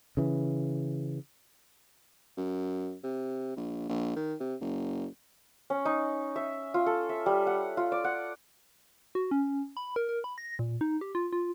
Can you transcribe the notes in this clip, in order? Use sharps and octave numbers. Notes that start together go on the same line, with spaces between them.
C#3 E3
F#2
C3
A#1
A#1
D#3
C3
F#1
C#4
D#4
E5
F4
A4
E5
G3
F#5
F4
D5
F#5
F#4
C#4
B5
A#4
A#4
B5
A#6
A#2
D#4
G4
F4
F4